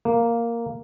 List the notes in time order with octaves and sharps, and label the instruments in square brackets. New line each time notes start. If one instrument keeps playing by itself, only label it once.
[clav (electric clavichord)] A#3